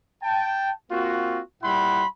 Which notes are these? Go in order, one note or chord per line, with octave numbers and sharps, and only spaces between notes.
G5 A5
A#3 C4 F4 F#4
A#2 G3 E4 F#5 B5 C6